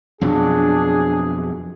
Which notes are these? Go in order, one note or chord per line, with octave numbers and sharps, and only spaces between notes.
F2 B2 F#3 D4 G#4